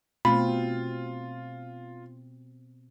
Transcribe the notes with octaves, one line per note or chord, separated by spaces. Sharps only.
B2 A3 C4 F4 B5